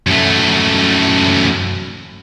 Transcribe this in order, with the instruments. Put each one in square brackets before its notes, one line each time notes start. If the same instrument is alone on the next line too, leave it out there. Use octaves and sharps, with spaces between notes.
[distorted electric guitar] F#2 A3